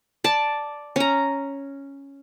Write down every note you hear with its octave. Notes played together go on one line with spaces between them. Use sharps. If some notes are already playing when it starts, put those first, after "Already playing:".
D5 A5
C#4 A#5